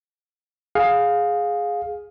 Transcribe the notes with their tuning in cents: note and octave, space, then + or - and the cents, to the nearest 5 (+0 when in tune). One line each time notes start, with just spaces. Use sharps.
G#4 +0 F5 +20